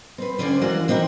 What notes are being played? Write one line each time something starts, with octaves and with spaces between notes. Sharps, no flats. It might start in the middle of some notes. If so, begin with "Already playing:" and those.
C4 B4
D2 D3 C4 C#4 D5 G#5
E3 G#3 F#4 A#4 F5 F#5
E3 C4 D#4 F#4 A#4